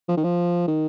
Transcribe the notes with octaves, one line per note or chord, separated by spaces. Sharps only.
F3
D#3
F3
D#3